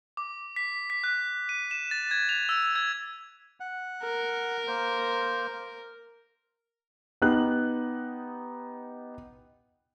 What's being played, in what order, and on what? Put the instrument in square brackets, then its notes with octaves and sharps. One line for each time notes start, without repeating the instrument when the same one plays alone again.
[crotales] D6
B6
B6
F#6
D#7
E7
A6
G#6
F7
E6
G#6
[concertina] F#5
[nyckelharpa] A#4
[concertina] A#3 C5
[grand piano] B3 D#4 G4 F#6 F#7